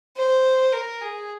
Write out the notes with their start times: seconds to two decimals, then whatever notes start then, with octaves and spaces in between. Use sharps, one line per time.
0.17 C5
0.73 A#4
1.01 G#4